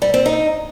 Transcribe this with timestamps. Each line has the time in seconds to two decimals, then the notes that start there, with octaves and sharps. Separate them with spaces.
0.02 G3
0.14 C4
0.26 D#4